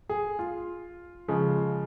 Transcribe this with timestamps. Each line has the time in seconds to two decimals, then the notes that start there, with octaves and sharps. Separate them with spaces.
0.09 G#4
0.39 F4
1.28 C#3 F3 G#3